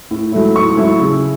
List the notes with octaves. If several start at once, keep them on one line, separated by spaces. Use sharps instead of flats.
A2
F#3 A3 E4
A2 C#6
F#3 A3 E4
C#3